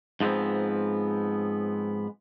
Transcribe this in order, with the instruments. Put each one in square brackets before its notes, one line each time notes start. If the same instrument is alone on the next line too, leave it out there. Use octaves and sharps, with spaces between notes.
[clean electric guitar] G#2 F3 B3 C4